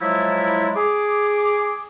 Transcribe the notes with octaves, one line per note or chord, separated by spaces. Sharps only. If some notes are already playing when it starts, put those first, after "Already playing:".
F3 F#3 G#3 A3 E4
G#4 D6